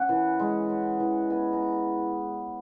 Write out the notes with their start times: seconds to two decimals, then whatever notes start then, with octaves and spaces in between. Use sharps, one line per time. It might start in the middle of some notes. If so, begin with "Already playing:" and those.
Already playing: C#4 F#5 G#5
0.09 E3
0.39 G#3
0.69 C#4
1.00 E3
1.30 B3 G#5
1.53 A#5